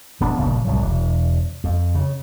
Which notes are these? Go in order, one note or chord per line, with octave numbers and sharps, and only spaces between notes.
D1 B3 D4
G1 A#2 C#3 F3
C2 A2 F#3
E1
F2
C#3